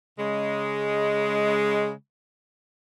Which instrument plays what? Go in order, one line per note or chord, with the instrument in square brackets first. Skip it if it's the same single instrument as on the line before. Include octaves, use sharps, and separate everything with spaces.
[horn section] C#3 G#3